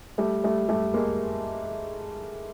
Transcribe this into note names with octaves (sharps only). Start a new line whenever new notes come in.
G3 A3
G3 A3
G3 A3
G#3 A#3